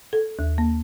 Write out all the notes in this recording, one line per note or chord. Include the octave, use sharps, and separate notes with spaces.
A4
D#2
A#3